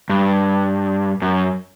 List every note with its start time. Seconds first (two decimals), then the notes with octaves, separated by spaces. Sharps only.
0.10 G2
1.22 F#2